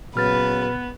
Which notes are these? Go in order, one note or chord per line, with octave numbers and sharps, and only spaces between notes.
A#2 C#3 F#3 B3 B4 F6 A6